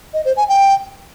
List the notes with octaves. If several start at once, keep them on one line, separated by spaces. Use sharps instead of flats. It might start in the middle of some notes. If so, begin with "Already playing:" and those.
D#5
C5
G#5
G5